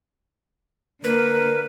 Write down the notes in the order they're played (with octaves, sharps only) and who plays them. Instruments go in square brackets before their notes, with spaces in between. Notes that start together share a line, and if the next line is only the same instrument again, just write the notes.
[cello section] D3 A#3 [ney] A#4 [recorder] B4